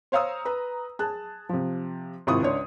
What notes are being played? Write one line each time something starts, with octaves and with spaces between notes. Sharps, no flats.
C5 C#5 F5 A#5 D#6 E6
B4 A#5
G#4 A5 F#6
C3 F3
G#1 C3 E4 F4 C#6 D#6
C#2 D4 C#5 C6